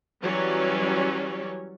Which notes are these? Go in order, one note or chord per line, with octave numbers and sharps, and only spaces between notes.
E3 F#3 G3 C#4 C#5 D5